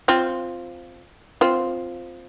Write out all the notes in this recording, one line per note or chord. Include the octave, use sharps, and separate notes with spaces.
C4 F4
C4 F4